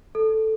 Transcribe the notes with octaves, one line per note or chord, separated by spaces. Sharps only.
A4